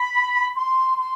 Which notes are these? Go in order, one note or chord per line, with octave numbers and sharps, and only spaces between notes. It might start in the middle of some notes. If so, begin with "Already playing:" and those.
Already playing: B5
C6
C6